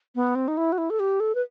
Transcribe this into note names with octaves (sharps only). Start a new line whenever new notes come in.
B3
C4
D#4
E4
F#4
E4
A4
G4
A4
B4